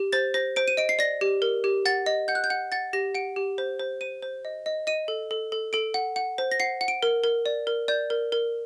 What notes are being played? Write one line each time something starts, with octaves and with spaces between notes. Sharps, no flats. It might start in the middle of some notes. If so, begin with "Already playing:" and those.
Already playing: G4
C5 A6
C5 A#6
C5 D7
D#7
D#5 D7
C7
D5 A#6
G4
A#4
G4
F#5 A6
D#5
F#5 G6
F#6
G6
F#5
F#5 A6
G4 A#6
F#5 D7
G4
C5
C5
C5 D#7
C5
D#5
D#5
D#5 D#7
A4
A4
A4
A4 D7
F#5
F#5
C5
A#6
F#5 C7
F#5
D7
A#4
A#4
D5
A#4
D5 G6
A#4
A#4